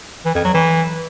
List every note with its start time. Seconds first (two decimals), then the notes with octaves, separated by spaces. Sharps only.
0.25 E3
0.35 F2
0.44 F#3
0.54 E3